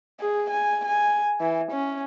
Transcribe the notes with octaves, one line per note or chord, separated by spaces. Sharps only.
G#4
G#5
G#5
E3
C#4